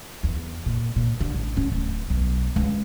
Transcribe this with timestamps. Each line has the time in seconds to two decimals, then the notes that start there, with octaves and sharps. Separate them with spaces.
0.23 E2
0.66 A#2
0.96 A#2
1.20 D3
1.34 A1
1.57 C#4
1.72 D1
2.10 B1
2.56 C#2